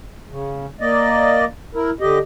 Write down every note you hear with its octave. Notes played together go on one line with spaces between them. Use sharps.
C#3
A#3 D5 D#5
E4 A#4
D3 G4 D#5